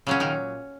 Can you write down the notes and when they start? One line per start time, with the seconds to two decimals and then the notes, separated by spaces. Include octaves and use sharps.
0.07 A#2 C#3 F#3 C#4
0.20 D#3 D#4